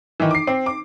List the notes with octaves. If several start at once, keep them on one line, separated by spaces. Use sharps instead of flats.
D#3 E3
D6 C7
C4
D6